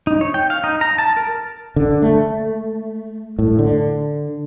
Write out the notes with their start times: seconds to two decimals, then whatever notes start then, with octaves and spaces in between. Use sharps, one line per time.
0.07 D#4
0.21 C#5
0.34 G5
0.50 F5
0.64 D#4
0.81 A#5
0.98 A5
1.17 A#4
1.76 D3
2.02 A3
3.39 A2
3.59 D3